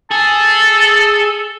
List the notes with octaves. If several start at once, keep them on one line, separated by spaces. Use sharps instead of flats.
G#4 A4 A5